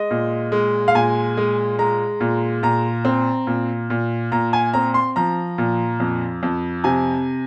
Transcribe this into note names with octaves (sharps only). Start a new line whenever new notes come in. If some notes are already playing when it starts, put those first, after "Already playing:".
Already playing: G#3 D#5
A#2
G#3
F5
A#2 G#5
G#3
G#3 A#5
A#2
A#2 A#5
C4
A#2
A#2
A#2 A#5
G#5
C4 A#5
C6
F3 A#5
A#2
F2
F2
C3 G#5